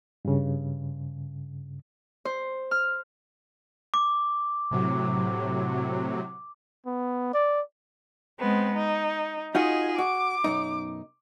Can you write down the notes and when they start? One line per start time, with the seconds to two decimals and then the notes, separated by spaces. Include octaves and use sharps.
0.25 G2 C#3
2.25 C5
2.71 F6
3.94 D6
4.71 A2 C3 F#3
6.86 B3
7.34 D5
8.40 G#3 B3 C4
8.76 D#4
9.55 D#4 F4 F#4 G#4 D#5
9.98 F#4 D6
10.44 B1 F#2 D#4